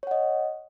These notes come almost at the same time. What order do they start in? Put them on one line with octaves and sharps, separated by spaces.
C#5 F#5 D#5